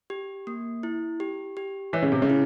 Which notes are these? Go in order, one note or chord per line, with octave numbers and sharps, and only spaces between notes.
G4
A#3
E4
G4
G4
E3 C#5
C#3
C3
C#3
E4